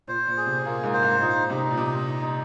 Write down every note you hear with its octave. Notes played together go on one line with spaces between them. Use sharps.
A#2 C5
A#2
G#4
C3
A#2 A#3
G#2
C5
G#2
A#2 D#4
C3 D#4
A#2
C3 D#5
D#4